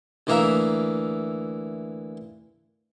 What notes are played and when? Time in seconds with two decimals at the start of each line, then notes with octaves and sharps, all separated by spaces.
0.27 D2 E3 A#3 A#4 E5